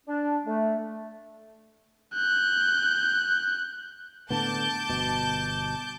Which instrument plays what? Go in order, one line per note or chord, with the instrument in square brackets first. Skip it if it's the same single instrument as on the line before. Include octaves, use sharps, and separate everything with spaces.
[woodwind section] D4
A3
[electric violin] F#6 G6
[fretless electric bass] A2 D3 B3 [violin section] A5 D6 G6
[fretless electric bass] G1 B2